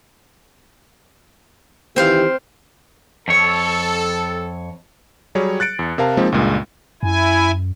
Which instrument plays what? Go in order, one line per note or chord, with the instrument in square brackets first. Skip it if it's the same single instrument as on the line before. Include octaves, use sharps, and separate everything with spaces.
[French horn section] D#3 E3 G4 [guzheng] C4 C5 F5
[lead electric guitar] F2 C#5 [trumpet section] A4
[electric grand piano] F#3 G3 G#4 C#5
F#6 A6 C#7 D7
E2
C3 A#4 F5 A5
F3 G#3 A#3 C4 D#4
C#2 G2 A#2 G#3
[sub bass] F#2 [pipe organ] E4 G#5